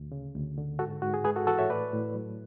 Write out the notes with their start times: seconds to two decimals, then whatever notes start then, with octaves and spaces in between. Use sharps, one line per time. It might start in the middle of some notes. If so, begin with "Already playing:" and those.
Already playing: D2
0.12 C#3
0.34 D2
0.58 D3
0.79 G#2 F#4 A4
1.02 G#2 F#4
1.14 G#4
1.24 G#3 G#4 B4
1.36 F#4 A4
1.47 E3 F#4 A4
1.58 C#5 E5
1.70 A2 B4 D5
1.93 A2
2.15 F#3